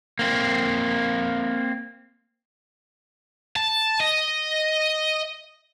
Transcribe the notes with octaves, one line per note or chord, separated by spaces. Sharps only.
A#3 C4
A5
D#5